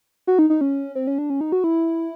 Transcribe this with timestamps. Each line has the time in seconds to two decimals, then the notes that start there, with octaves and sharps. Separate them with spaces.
0.27 F#4
0.39 D#4
0.50 D#4
0.61 C#4
0.95 C4
1.07 C#4
1.18 D4
1.30 C#4
1.41 D#4
1.52 F#4
1.64 E4